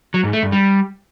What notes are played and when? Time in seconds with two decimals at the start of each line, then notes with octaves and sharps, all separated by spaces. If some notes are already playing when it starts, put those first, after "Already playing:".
0.14 F#3
0.24 G#2
0.33 A3
0.43 G2
0.52 G3